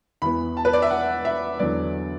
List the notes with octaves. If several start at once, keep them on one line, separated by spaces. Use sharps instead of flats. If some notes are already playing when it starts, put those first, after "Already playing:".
E2 E3 B3 B5
A5
B4
D5
E5
F#5
E5
E2 D3 F#3 B3 D5